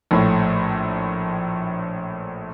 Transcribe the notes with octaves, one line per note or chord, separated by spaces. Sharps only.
A#1 A2